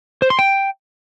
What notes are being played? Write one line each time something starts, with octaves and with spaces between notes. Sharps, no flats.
C5
C6
G5